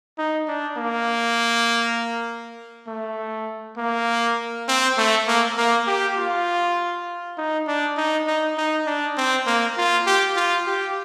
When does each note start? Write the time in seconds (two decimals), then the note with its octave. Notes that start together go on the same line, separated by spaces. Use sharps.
0.18 D#4
0.48 D4
0.78 A#3
2.87 A3
3.78 A#3
4.68 C4
4.97 A3
5.28 A#3
5.58 A#3
5.87 G4
6.17 F4
7.38 D#4
7.67 D4
7.97 D#4
8.27 D#4
8.58 D#4
8.87 D4
9.17 C4
9.47 A#3
9.77 F4
10.06 G4
10.36 F4
10.67 G4